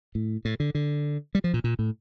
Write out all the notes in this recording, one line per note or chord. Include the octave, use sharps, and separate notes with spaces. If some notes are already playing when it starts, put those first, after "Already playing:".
A2
A2
D3
D3
G3
F3
A#2
A#2
A2